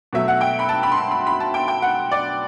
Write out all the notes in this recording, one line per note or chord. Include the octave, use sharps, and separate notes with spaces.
B2 F#3 A3 E5
F#5
G5
B5
A5
B5
C6
B5
B5
B5
A5
G5
G5
F#5
D5